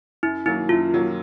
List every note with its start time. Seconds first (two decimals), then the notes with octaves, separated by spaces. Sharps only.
0.23 F#2 E4
0.45 D#3 F#3 A#3 E4
0.69 F#2 F4
0.92 D#3 F#3 A#3